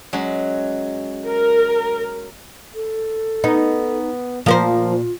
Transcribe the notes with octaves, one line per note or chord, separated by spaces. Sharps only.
F#3 G#3 C#4
A#4
A4
B3 D#4
A#2 F3 F4 A#4 C5